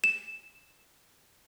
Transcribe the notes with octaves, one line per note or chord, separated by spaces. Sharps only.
E7